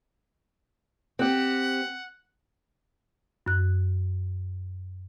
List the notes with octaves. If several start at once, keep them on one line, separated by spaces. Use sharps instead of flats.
C4 G4 F#5
F#2 F#6